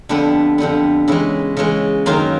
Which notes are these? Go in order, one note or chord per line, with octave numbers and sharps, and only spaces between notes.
F2 D3 G3 B3 D4
F2 D3 G3 B3
C#3 E3 G#3 E4
C#3 E3 G#3
F#2 D#3 F#3 A#3 F4